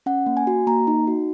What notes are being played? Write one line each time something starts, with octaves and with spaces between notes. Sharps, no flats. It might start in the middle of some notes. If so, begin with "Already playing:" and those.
C#4 F#5
A#3
G#5
F#4
A#3 A#5
D#4
F#4